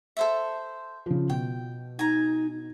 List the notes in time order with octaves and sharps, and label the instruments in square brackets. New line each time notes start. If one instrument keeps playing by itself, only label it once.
[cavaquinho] A4 C5 E5
[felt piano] C#3 F3
[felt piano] B2 [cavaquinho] G5
[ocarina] D#4 [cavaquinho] G#5 A#5